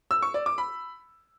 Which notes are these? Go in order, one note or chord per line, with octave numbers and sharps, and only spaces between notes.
E6
C#6
D5
D6
B5